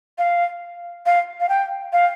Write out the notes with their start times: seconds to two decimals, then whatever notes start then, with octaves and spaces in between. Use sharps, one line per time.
0.18 F5
1.06 F5
1.40 F5
1.49 G5
1.93 F5